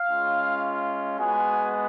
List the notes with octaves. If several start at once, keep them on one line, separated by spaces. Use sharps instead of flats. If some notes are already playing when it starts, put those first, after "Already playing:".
Already playing: F5
G#3 C#4 F4
G#3 B3 F#4 G#5